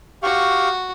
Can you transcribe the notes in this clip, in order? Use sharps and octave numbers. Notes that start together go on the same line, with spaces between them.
F#4 G4 F5 C#6